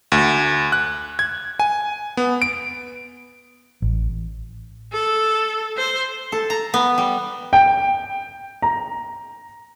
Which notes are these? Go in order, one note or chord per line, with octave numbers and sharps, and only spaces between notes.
D2
F#6
G#6
G#5
B3
D7
A1
A4
C5
A4
A#5
B3
G3
G5
A#5